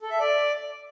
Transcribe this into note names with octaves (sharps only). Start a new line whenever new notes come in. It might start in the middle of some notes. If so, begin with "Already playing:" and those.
A4
E5
D5